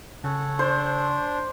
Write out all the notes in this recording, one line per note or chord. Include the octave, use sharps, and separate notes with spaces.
C#3 A4 C#5 F#5
D4 C5